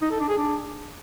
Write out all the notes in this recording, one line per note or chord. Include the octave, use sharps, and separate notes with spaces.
D#4
A4
D4
G#4
D4